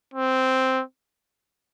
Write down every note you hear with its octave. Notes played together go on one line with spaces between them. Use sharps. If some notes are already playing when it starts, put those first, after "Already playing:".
C4